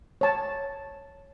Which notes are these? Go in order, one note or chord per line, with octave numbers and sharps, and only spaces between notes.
C#5 A5